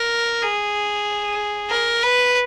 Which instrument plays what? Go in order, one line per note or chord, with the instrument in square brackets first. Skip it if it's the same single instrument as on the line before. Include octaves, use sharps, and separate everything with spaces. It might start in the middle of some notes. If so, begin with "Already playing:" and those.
Already playing: [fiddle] A#4
G#4
A#4
B4